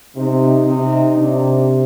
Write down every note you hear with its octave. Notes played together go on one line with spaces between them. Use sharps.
C3 D#4
C3 D#4
C3 D4